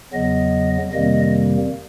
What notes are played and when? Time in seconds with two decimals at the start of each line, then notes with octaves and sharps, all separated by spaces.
0.13 E2 C#3 F#3 B3 D#5
0.93 F2 C3 D#3 G3 A#3 D#5